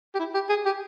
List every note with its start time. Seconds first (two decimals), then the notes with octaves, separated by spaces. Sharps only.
0.15 G4
0.19 E4
0.34 G4
0.49 G#4
0.65 G4